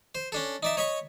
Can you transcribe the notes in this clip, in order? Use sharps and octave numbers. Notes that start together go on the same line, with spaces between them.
C5
C#4 D4 A4
D#4 D5 E5
C#5 D#5 B5 C#6